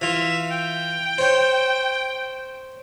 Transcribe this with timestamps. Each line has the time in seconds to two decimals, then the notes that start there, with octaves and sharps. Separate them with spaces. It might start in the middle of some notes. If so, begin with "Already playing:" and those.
0.01 E3 F4 E5
0.51 G5
1.18 C5 C#5